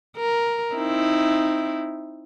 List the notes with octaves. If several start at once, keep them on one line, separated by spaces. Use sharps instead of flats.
A#4
C4 D#4 E4